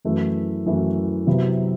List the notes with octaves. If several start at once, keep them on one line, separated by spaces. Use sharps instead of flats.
F#2 E3 A3 E4 B4
F#2 E3 A3 E4 B4
C3 F#3 B3 E4